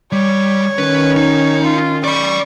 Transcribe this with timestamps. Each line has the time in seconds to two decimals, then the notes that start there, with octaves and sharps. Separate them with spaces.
0.12 G3 C#5
0.78 D#3 C#4 B4
1.16 D#4
1.63 F4
2.04 D5 B5 C#6